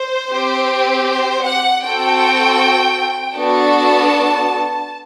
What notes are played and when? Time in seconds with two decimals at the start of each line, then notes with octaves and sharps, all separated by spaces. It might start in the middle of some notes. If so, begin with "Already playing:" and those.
Already playing: C5
0.31 C4 G4
1.06 C5
1.45 F#5
1.83 C4 F#4 A4 G5
3.34 B3 D4 F#4 A4 A5